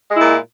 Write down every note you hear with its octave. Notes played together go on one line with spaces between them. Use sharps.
A#2 G#3 E4